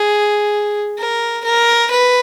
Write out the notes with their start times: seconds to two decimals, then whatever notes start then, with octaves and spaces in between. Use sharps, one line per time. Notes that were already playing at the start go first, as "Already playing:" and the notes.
Already playing: G#4
0.99 A#4
1.45 A#4
1.91 B4